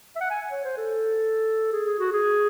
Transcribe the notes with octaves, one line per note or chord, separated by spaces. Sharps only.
E5
F#5
G#5
C#5
C5
A4
G#4
G#4
F#4
G#4